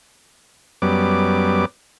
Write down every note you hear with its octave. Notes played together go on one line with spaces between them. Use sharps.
F#2 G3 B3 D6